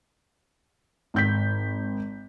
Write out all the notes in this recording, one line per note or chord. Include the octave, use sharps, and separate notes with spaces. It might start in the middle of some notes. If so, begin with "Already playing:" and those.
G#1 G6 B6